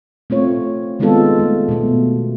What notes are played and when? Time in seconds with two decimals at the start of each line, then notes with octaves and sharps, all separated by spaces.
0.30 A3 C4 F4 C#5
0.99 D#3 G#3 B3 C4 F4 A4
1.39 A3
1.69 B2 A3